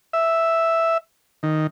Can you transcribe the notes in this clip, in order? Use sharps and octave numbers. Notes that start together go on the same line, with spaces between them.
E5
D#3